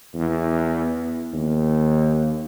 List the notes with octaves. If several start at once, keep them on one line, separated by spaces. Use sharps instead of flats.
E2
D#2